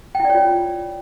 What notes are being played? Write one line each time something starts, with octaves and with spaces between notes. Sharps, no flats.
E4 F4 C#5 D5 G5